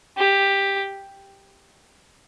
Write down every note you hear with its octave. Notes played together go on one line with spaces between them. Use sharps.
G4